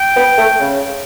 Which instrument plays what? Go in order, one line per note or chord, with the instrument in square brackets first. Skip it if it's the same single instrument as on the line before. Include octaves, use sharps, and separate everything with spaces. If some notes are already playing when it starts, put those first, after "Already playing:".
Already playing: [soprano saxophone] G5
[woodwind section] B3
A3
C#3